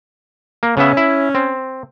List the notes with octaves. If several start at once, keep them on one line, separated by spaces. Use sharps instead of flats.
A#3
C#3 B3 C#4 E5
E4
C4